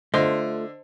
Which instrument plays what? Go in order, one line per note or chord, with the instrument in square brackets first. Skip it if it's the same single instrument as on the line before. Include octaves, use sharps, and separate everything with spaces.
[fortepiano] D3 [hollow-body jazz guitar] A3 F4 [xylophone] C5 D#5 C6